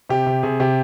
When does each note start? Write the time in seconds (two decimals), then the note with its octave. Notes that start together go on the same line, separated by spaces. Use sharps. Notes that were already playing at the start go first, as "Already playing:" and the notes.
0.09 C3 G4
0.26 C3
0.43 C3 G#4
0.60 C3 G4